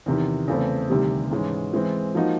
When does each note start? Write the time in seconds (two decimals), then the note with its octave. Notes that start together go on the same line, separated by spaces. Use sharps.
0.06 E2 C3 D#3
0.48 E2 C#3 E3 A3 C4
0.89 D2 C3 D#3 G3
1.31 G#2 E3 G#3 C#4
1.74 E3 G#3 C4
2.15 F3 A#3 D#4 F#4